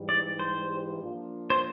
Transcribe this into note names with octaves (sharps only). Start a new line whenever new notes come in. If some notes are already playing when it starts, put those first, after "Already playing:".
Already playing: G#2 E3 G3
D5
C5
F3 A#3 D4 F4
C5